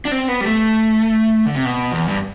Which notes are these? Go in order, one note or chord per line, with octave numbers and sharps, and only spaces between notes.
D4
C4
B3
G3
A3
D3
C3
B2
E2
G2